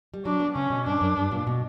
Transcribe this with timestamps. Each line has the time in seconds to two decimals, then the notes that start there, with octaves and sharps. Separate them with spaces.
0.14 G3
0.25 F#3 D4
0.40 B3
0.55 C#3 C#4
0.70 B2
0.86 G2 D4
1.01 F#2
1.17 G2
1.31 A#2
1.47 B2